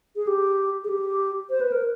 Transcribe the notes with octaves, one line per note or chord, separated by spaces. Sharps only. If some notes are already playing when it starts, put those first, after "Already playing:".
G#4
G4
G#4
G4
C5
B4
A#4